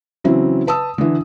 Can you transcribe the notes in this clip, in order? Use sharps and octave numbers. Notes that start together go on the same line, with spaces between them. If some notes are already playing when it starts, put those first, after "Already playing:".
C#3 E3 F#3 C4 E4
B4 A5 D#6 E6
D3 E3